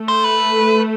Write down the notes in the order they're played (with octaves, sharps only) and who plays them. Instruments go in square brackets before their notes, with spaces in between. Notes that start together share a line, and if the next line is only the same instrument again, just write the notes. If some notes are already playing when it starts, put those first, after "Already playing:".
Already playing: [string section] A3
[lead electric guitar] C5
B4